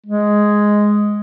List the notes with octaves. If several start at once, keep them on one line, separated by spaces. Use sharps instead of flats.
G#3